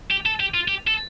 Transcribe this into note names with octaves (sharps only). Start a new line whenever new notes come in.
G4
A4
G4
F4
G4
A4